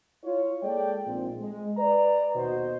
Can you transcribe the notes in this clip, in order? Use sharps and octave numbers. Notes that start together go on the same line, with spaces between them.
E4 F4 C#5
G#3 A#3 G#4 A4 D5 G5
A#1 G#2 C4
G#3
B4 D5 A#5
D#2 B2 B3 F#4 C5 D#5